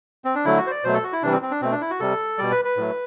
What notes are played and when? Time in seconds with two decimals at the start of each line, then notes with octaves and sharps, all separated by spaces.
0.25 C4
0.35 D4
0.45 D3 F#3 A3 E4
0.58 F#4
0.67 C5
0.71 D5
0.84 B2 F#3 A3 C5
0.94 A4
1.04 F#4
1.13 E4
1.23 C3 E3 G3 D4
1.32 C4
1.42 C4
1.51 D4
1.61 B2 A3 C4
1.71 D4
1.81 E4
1.90 F#4
2.00 C3 G3 A4
2.38 B2 G3 D5
2.51 B4
2.65 B4
2.77 A2 F#3 A3